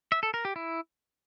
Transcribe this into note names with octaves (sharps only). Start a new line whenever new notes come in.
E5
A4
A#4
G4
E4